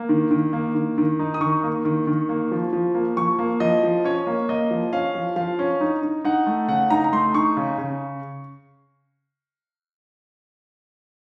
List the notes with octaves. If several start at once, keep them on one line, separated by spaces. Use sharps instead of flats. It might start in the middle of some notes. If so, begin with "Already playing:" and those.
Already playing: A#3
D#3
D#3
A#3
D#3
D#3
D#4
D#6
D#3 C#6
A#3
D#3
D#3
A#3
F3
F3
A#3
F3 C#6
A#3
F3 D#5
F3
C#4 C#5
A#3
A#3 D#5
F3
C#4 F5
F3
F3 F5
C#4
D#4
D#4
D#4 F#5
A3
C#3 F#5
D#4 A#5
A#5
A3 C6
D#4 C#6
C#3
C#3